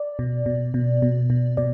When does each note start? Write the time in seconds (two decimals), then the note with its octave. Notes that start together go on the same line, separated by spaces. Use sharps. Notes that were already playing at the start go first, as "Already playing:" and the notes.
Already playing: D5
0.19 B2
0.46 B2
0.74 B2
1.02 B2
1.30 B2
1.57 B2 D5